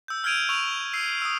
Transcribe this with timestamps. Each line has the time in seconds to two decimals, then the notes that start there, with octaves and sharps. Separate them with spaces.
0.08 E6 G6
0.24 F6 G6 G#6 D7 D#7 F7
0.49 C#6 E6 D7 F7 F#7
0.93 E6 C7 D#7
1.22 D#6 E6